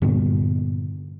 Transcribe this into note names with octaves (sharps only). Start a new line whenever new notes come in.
G2 A#2 D3 B3